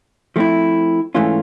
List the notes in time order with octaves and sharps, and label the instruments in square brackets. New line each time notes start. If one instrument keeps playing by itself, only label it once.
[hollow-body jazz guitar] F3 A3 C4 E4
G#2 E3 A3 C#4 F4